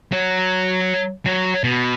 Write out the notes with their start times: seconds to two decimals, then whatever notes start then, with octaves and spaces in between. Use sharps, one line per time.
0.12 F#3
1.26 F#3
1.64 B2